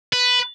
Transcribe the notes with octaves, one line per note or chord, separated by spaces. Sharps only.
B4